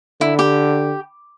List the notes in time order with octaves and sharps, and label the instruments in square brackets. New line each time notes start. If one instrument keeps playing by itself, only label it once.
[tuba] D3 [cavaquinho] E4
[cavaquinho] G4